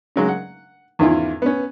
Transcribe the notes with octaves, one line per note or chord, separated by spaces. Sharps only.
C#3 F#3 G#3
F#5
E2 G#2 D#3 C#4 E4 F4
B3 C#4